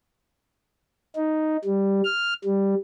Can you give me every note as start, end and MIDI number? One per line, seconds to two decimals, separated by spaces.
1.16 1.57 63
1.65 2.02 55
2.04 2.33 89
2.45 2.75 55